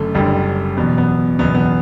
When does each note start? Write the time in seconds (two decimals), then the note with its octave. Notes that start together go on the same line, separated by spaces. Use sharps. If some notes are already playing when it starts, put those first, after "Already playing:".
Already playing: F#1 F#2 D3 A3
0.15 F#1 F#2 D3 G3
0.77 F#1 E2 B2 B3
0.98 B3
1.39 F#1 E2 B2 B3
1.55 B3